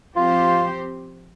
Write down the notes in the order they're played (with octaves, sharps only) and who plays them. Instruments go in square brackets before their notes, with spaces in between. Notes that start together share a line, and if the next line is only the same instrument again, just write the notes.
[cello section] F3 C4 G4 C5 [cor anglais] F4